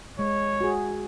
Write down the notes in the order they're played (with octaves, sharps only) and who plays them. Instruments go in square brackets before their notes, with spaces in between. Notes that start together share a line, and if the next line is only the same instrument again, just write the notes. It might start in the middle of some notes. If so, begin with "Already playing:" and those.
[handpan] G#3 [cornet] C#5
[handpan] F#4 G#4